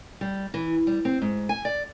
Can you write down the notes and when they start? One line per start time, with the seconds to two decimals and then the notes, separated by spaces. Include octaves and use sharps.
0.21 G3
0.54 E3
0.87 G3
1.05 C4
1.21 G#2
1.49 G#5
1.65 D5